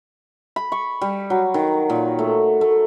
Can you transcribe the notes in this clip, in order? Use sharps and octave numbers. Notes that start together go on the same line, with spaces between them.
B5
C#6
G3
F#3
D#3
A#2
A3
A3